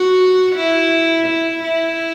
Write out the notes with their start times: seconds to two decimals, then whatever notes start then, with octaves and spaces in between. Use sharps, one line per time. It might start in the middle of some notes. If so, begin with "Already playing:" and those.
Already playing: F#4
0.55 E4
1.26 E4
1.63 E4